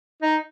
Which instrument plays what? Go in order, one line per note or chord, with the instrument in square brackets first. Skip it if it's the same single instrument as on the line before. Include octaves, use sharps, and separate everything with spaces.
[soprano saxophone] D#4